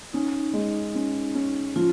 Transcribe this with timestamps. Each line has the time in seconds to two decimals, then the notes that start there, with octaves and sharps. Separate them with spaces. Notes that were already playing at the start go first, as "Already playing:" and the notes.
0.13 C#4 D#4
0.53 G#3
0.95 C#4
1.35 C#4
1.76 F3 F4